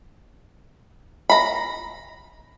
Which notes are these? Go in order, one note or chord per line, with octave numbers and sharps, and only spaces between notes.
A#5 B5